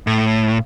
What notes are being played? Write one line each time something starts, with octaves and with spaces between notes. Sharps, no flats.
A2